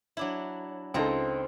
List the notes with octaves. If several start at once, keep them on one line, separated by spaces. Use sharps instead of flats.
F#3 D4 E4
C#2 C4 D#4 F4 A4 A#5